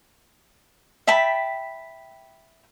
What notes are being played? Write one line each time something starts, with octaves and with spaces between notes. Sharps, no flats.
E5 G5 A5 B5